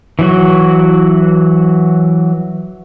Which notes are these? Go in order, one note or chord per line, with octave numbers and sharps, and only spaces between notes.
E3 F#3 F#4